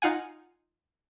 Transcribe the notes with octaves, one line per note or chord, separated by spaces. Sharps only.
D#4 F4 F#5 G#5